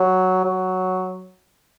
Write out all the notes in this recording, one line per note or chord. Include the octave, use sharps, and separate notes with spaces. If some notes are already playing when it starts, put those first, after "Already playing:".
Already playing: F#3
F#3